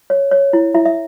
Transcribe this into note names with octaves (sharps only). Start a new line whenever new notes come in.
C#5
C#5
E4
E4 E5
E5